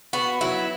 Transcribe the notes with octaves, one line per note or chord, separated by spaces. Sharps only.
B3 F#4
F#3 E4